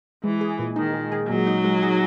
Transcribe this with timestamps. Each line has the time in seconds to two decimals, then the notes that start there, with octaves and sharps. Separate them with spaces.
0.24 E3 G#3
0.41 G#4
0.59 A#2
0.76 D#3 D#4
0.94 G#3
1.12 G#4
1.29 A#2 F#3
1.47 D#4
1.64 G#3
1.83 G#4